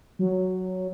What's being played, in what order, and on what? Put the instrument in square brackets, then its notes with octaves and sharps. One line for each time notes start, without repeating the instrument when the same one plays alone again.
[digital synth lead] F#3